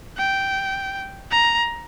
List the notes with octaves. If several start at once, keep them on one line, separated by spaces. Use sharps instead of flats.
G5
A#5